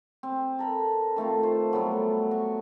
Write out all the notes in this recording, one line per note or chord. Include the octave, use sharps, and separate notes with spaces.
C4
A4 A#4 B5
D#3 A3 C4 F4
C5
F#3 G3 A3 B3
F#4 C#6